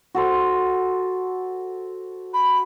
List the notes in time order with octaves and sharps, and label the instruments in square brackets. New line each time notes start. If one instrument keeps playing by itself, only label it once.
[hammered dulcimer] F#4 A4 C5
[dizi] B5